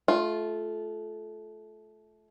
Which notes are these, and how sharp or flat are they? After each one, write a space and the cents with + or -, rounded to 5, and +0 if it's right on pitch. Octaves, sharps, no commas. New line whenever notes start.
A3 -20 F4 +0